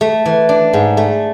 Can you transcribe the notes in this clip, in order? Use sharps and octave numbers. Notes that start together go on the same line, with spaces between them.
A3
E3
D4
G#2
A3